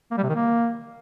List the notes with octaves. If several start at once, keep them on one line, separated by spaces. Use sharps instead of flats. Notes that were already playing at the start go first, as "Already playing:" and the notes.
A#3
G3
C3
D#3
A#3